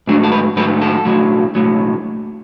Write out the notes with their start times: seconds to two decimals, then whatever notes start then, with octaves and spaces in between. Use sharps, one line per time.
0.07 G#2 F#3 A3 D4
0.24 A4
0.32 B4
0.56 G#2 F#3 A3 B4
0.81 A4
1.05 B1 A2 F#3
1.55 B1 A2 F#3